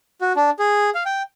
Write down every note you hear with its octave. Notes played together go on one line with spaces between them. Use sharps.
F#4
D4
G#4
F5
G5